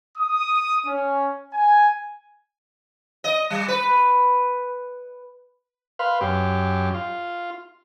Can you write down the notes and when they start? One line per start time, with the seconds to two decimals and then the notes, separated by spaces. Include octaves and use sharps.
0.18 D#6
0.87 C#4
1.53 G#5
3.24 D#5
3.50 G3
3.68 B4
5.99 B4 F5 C6
6.21 F#2 G4
6.94 F4